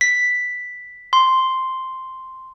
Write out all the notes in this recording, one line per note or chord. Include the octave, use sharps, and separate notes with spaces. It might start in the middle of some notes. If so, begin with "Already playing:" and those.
B6
C6